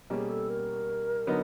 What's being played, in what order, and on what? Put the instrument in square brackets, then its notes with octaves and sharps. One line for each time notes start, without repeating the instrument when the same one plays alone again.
[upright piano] B2 G3 A#3 C#4 [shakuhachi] G#4
[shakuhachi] A4
A#4
[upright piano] D3 F#3 B3 D#4